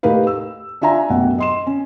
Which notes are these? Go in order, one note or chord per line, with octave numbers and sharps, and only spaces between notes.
A2 D#4 G4 A#4 B4 F5
E6
D4 F4 E5 G#5 A#5
A1 F#2 B2 F#5
D#5 C6 E7
C#4